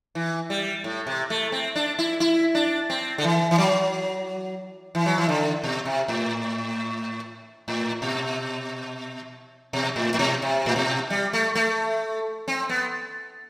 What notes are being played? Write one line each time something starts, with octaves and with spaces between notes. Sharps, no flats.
E3
G3
A2
C3
A3
C4
D4
E4
E4
D4
C4
D3
E3
E3
F#3
E3
F#3
E3
D3
B2
C3
A2
A2
B2
B2
A2
A2
B2
C3
A2
B2
G3
A3
A3
C4
B3